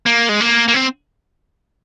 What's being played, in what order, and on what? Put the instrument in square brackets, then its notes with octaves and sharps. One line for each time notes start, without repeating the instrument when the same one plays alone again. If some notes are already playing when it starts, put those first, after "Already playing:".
[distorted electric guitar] A#3
G#3
A#3
A#3
C4